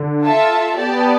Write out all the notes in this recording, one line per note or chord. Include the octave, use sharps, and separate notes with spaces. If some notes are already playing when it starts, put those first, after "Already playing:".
Already playing: D3
F4 A4 E5 A5
B3 G4 D5 A5